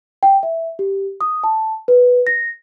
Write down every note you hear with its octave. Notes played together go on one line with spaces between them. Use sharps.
G5
E5
G4
D#6
A5
B4
A#6